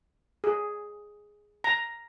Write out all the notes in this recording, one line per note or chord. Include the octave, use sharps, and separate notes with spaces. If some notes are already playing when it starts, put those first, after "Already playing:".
G#4
A#5